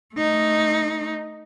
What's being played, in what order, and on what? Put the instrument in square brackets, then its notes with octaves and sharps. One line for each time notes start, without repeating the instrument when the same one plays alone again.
[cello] A3 D#4